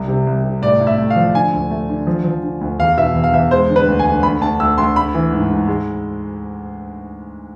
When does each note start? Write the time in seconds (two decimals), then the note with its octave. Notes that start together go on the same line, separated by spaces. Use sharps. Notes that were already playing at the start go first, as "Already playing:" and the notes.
Already playing: C2
0.08 C3
0.27 C2
0.44 C3
0.62 A2 D5
0.80 A2
0.87 E5
0.98 A3
1.10 F5
1.16 F3
1.35 D3 G#5
1.53 D2
1.70 A3
1.89 D3
2.07 F3
2.24 F3
2.43 D3
2.61 D2
2.79 E2 F5
2.97 B2 E5
3.15 E2
3.24 F5
3.33 E2 E5
3.51 G#3 C5
3.69 D3
3.76 B4
3.87 D2
3.99 G#5
4.06 D2
4.23 D2 B5
4.41 D2 A5
4.60 D2 E6
4.78 D2 C6
4.96 A3 B5
5.14 E3
5.32 G#2
5.50 G#2
5.68 G#3